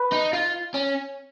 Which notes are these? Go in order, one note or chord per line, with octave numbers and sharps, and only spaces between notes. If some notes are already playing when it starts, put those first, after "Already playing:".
Already playing: B4
D#4
F4
C#4